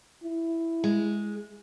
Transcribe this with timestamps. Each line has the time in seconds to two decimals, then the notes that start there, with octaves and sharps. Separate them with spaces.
0.24 E4
0.84 G#3